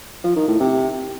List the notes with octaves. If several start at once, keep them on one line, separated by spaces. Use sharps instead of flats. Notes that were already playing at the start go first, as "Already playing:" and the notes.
F3
D#3
A2
C3